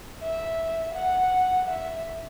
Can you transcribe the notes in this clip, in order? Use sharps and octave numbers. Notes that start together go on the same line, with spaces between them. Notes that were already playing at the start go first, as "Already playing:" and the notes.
E5
F#5
E5